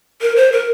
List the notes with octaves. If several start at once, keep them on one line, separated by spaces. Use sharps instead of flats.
A#4
C5
A#4